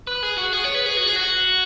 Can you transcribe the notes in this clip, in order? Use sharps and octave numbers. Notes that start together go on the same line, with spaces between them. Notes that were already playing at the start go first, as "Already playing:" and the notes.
B4
G#4
F#4
G#4
C#5
B4
G#4
F#4
G#4
F#4